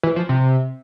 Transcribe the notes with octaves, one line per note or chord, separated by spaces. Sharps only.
E3
F3
C3